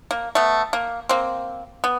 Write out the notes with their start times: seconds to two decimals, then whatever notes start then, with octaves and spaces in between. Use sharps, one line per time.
0.11 A#3
0.35 A3 B3
0.73 A#3
1.09 A#3 C4
1.84 B3